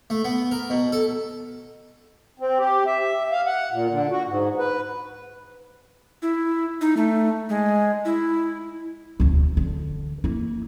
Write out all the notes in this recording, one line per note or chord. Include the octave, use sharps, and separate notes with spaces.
A3
B3
A#4
B2
A4
C4
G4
E5
F5
F#5
A#2
D3
F#4
G#2
B4
E4
D#4
A3
G#3
E4
E1 D2
D3
A#3 E4